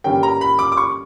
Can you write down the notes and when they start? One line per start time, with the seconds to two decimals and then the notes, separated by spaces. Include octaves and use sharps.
0.04 G2 D3 G3 A#3 C#4 G5
0.23 A#5
0.41 B5
0.59 D6
0.72 D6
0.77 C#6